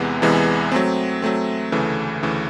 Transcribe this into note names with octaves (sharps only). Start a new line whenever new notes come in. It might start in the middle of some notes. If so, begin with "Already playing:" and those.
Already playing: E2 C3 E3 G#3 B3
E2 C3 E3 G#3 B3
F#3 A3 C4
F#3 A3 C4
D2 C#3 E3 A3
D2 C#3 E3 A3